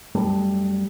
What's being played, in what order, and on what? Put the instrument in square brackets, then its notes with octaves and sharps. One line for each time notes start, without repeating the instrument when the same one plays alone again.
[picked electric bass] F#2 G3 A3